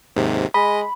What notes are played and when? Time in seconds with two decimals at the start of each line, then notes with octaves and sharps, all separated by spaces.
0.16 D#2 G#2 C3
0.54 G#3 D#5 B5